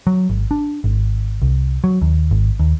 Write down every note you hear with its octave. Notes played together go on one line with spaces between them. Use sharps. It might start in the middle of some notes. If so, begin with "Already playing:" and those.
F#3
G#1
D4
G#1
C2
F#3
D#2
G#1
D#2